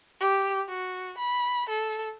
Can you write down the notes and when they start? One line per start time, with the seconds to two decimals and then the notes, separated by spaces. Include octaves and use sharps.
0.20 G4
0.68 F#4
1.18 B5
1.69 A4